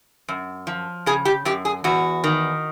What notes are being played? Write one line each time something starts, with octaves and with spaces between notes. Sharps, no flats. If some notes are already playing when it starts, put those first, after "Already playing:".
F#2
F3
C#3 G#4
G4
F#2 G4
G#4
E2 F#4
D#3